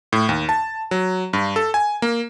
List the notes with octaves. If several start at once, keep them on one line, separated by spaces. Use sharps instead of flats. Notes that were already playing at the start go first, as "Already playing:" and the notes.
A2
D#2
A5
F#3
G2
A4
G#5
A#3